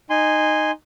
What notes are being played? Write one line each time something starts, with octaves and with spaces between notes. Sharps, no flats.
D#4 G#5 C6